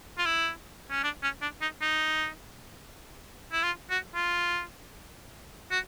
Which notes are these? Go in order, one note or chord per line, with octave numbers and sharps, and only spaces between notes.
F4
E4
C#4
D4
C#4
D4
D#4
D#4
E4
F4
F#4
F4
F#4